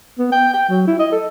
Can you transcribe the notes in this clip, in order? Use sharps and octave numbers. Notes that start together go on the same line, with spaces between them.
B3
G5
G5
F#3
E4
D#5
A4